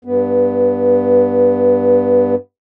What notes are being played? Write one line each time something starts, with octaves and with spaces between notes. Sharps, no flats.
G2 B3